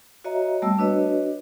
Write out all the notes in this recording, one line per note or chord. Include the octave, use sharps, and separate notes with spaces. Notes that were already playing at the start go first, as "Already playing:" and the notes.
F#4 C#5 D#5 E5 A#5
G3 A3 B3 A5 E6
D4 F#4 B4 C#5 D#5